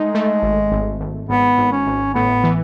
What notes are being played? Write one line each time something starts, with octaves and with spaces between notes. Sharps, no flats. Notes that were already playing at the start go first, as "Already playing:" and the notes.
Already playing: G#3 A3 D#4
A3
G#1
G#1
G#1
G#1 B3
G#1
C#4
G#1
A2 B3
E3